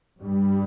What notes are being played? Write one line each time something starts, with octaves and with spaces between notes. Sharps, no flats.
G2 G3